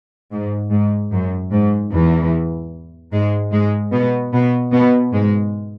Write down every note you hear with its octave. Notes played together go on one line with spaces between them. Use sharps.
G#2
G#2
F#2
G#2
E2 E3
G#2 G#3
G#2 G#3
B2 B3
B2 B3
B2 B3
G#2 G#3